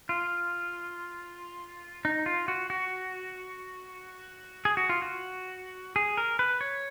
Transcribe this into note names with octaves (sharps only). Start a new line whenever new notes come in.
F4
D#4
F4
F#4
F#4
G#4
F#4
F4
F#4
G#4
A#4
B4
C#5